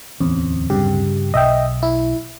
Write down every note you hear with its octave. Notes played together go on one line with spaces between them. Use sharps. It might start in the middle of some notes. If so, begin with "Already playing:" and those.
D1 E2 C4 C#4
G2 C#3 G4
B1 D#5 E5 G5
E4